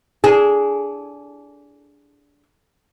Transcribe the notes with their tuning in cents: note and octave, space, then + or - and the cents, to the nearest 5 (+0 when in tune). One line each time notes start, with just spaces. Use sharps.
D4 -20 G#4 +0